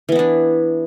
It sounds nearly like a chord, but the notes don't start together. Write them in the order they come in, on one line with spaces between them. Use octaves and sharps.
E3 B3 E4 D4